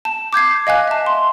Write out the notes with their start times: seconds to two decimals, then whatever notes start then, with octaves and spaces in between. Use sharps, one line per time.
0.05 A5
0.33 D6 G6 G#6 C7
0.67 D#5 F5 G#5 F#6
0.88 E5 A5
1.06 C6